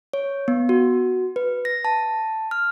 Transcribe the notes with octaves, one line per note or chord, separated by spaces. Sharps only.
C#5
B3
F#4
B4
A#6
A5
F6